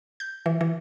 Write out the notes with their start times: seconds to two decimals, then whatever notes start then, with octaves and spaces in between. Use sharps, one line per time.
0.20 G6
0.46 E3
0.61 E3